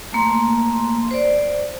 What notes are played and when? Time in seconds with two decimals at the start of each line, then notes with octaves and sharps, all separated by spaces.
0.13 A3 A#3 C6
1.11 C5 D5